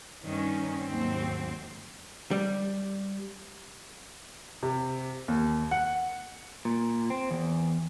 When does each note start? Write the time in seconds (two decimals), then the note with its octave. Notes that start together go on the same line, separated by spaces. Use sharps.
0.23 G2 D#3 C#4
0.84 D#2 G#2 F#3 C4
2.31 G3
4.63 C3
5.28 D#2
5.71 F#5
6.65 A#2
7.10 C4
7.31 E2